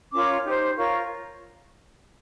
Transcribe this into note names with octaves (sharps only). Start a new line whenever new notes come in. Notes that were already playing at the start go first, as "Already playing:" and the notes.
C#4 F4 A#4 C#5 D6
D#4 G4 C5
F4 A#4 C#5 C#6